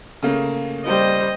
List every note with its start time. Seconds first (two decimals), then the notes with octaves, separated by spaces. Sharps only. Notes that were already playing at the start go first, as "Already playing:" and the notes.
0.23 C#3 A3 A#3
0.85 G3 C5 D#5